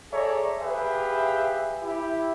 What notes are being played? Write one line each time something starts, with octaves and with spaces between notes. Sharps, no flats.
G#4 A4 C#5 D5 E5 A#5
G4 G#4 B4 E5 F5 G5
E4 G4